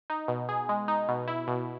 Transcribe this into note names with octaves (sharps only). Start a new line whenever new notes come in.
D#4
B2
G#4
G#3
D#4
B2
E4
B2